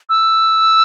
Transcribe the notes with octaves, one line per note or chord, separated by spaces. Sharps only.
E6